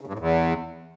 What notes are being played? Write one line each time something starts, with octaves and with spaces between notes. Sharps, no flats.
C#3
G2
A2
E2